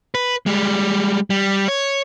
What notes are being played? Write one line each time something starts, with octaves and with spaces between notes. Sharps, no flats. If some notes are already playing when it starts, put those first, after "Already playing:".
B4
G3 G#3
G3
C#5